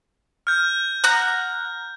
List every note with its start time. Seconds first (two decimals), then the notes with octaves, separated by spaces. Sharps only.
0.47 F6 G6
1.04 F#5 A#5